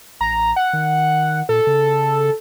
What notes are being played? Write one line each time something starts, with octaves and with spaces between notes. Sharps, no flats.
A1 A#5
F#5
D#3
A#2 A4
C#3